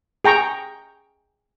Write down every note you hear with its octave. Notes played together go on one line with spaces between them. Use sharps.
G#4 G5 A#5 C#6